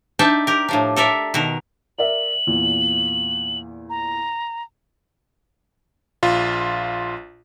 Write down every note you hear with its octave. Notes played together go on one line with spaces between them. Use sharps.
D4 D#4 E5 G5 A5
G4 A#4
A2 F3 D4
A4 A#4 D5 E5
B2 D#3 A#4
A#4 D5 E5 F#7
E2 A#2
A#5
A#1 F4